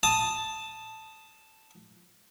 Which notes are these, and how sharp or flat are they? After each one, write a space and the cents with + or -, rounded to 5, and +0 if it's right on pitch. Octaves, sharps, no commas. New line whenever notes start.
A5 +0 D#6 +0